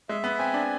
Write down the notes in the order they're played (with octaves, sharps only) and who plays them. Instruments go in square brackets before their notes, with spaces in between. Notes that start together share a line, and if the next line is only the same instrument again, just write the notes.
[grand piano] G#3 [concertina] E5
[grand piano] B3
[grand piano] C4 [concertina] G#5
[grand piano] D4